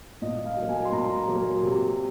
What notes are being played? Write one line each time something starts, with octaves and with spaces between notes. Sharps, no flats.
A#2 D#5
F5
F#3 A#3
G#5
C6
A#2 A#5
F#3 A#3
C3